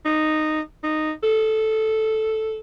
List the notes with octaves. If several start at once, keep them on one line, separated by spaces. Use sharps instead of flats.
D#4
D#4
A4